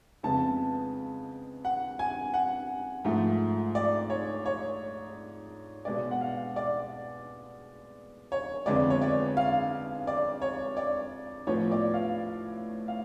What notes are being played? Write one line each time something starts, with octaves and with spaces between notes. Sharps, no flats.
F2 C#3 G#3 B3 A5
F#5
G#5
F#5
G#2 F3 A3
D5
C#5
C#5
B2 G#3 B3 D5
F#5
F5
D5
C#5
F2 D3 G#3 B3 D5
C#5
D5
F5
D5
C#5
D5
A2 F3 B3 C#5
D5
F5
F5